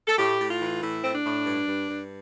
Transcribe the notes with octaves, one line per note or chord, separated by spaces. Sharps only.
A4
A2 G4
A2
F4
E3
A2 E4
A2 C4
D4
A2
G2
G2
G2